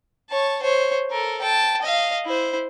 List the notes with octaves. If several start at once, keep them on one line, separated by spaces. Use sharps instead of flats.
C#5 A5
C5 C#5
A4 A#4
G5 A5
D#5 F5
E4 C5